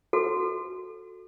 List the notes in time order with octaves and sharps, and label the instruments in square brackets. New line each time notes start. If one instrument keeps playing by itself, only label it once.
[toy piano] F#4 A4